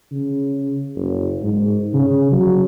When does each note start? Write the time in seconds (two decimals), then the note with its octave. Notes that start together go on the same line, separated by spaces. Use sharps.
0.11 C#3
0.95 F#1
1.42 G#2
1.94 C#3
2.32 F#3